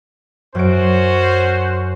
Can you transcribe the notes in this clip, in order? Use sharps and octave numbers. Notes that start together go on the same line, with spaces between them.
F#2 C#4 F#4 C5 D7